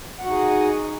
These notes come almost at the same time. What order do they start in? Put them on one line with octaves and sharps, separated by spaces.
F#5 F#4 D#4 G#4